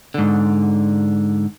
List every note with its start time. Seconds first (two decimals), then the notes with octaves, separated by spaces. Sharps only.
0.14 G#2 D3